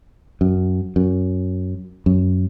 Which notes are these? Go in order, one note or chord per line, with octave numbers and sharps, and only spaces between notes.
F#2
F#2
F#2